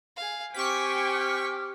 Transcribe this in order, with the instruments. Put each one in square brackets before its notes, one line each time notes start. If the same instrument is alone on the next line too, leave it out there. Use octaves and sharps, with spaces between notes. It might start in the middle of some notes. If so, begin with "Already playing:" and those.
[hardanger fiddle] G#4 F5
[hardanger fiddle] C4 G4 [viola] G5 G#5 [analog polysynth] C#6 B6 [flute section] D6 F6